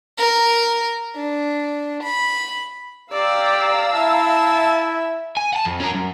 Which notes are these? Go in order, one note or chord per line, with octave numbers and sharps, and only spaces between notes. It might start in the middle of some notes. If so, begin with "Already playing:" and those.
A#4
D4
B5
G4 D5 F5 A#5 E6
E4 E5 A5
G#5
F#5 A5
F2
C#4 A#4
F#2